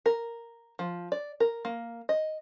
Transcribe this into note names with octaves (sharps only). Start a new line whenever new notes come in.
A#4
F3
D5
A#4
A#3
D#5